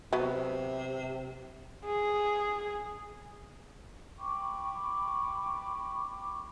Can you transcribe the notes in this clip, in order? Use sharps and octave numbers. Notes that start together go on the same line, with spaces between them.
C3 F#3 B3
G#4
G5 B5 C#6 D6